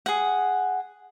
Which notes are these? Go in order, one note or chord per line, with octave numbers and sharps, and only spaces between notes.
G#4 F#5